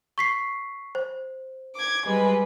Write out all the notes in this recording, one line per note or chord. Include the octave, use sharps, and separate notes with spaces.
C#6 B6 C7
C5
D6 G#6
G3 G#3 B4